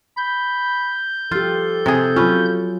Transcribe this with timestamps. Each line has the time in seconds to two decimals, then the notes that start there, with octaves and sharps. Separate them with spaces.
0.17 B5 G6
1.31 F3 F4 G4 A4
1.86 C3 G#4
2.16 F#3 C#4 F4 B4